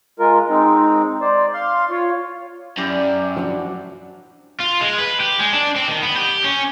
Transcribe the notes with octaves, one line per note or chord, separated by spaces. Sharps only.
G#3 F4 A#4
G#3 C4 D#4
C5 D5
F5 C6
F4 C#5
F#2 E4 G4 D5
F3 D4 F#4
F4
G#3
B4
G4
G#3
D4
C4
D#3
B3
G4
C#4